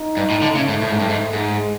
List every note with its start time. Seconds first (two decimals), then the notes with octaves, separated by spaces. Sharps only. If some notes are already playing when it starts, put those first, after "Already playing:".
Already playing: D#4
0.17 G2
0.30 A2
0.42 D3
0.55 C#3 A3
0.68 G#2
0.82 A2
0.91 G#2
1.00 G2
1.09 G#2
1.33 G#2 G#3